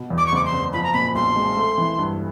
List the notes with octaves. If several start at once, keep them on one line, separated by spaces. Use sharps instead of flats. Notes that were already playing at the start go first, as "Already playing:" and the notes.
Already playing: B2
E2
D6
C#6
F#1 D6
C6
F#1
F3 B5
A#5
A#2 B5
B1 C6
G#3
A3
E3
G2